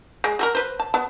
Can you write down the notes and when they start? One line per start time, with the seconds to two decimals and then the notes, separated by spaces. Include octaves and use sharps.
0.24 G#3
0.39 F#4 A4 A#4
0.55 B4 C5
0.80 A5
0.94 B3 A5